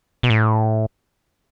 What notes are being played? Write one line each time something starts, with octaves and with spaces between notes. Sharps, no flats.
B2
A2